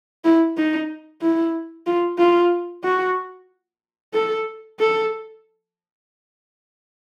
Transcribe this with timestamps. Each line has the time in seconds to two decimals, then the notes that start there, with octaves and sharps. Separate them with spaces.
0.25 E4
0.57 D#4
1.22 E4
1.87 F4
2.18 F4
2.84 F#4
4.14 A4
4.80 A4